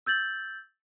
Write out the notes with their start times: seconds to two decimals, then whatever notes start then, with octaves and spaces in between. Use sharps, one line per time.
0.06 E6 G6 A6 F#7